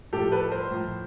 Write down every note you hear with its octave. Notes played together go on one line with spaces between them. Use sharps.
A2 F3 G4 A4
A4 B4
A#4 C5
A2 F3